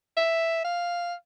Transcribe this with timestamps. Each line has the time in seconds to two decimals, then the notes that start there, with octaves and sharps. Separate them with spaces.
0.17 E5
0.65 F5